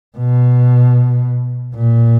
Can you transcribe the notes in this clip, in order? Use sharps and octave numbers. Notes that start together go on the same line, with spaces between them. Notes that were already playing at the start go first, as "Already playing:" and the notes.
B2
A#2